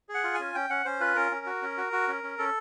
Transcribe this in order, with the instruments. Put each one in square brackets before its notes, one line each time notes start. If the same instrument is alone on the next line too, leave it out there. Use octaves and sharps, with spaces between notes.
[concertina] G#4
F#5
F4
C#4 G#5
C#4 G5
C#4 F#5
C#4 C5
F4 B4
C#4 A#4
C#4
F#4
C#4
F#4
F#4
C#4
C#4
C#4 A4